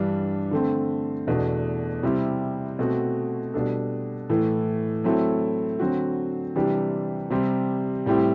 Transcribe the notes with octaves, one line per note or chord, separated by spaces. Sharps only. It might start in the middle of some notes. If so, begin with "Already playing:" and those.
Already playing: G2 E3 G3 D4 G4
D3 A3 C4
E2 B2 A3 D4
C3 G3 C4 E4
B2 A3 C4 F#4
B2 G3 D4 A4
A2 E3 A3
F#3 A3 C4 E4 A4
D3 F#3 C4 F#4
C3 E3 G3 D4 G4
C3 G3 C4
A2 G3 C4 E4 G4